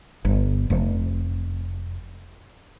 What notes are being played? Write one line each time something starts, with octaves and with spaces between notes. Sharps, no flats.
G1
F1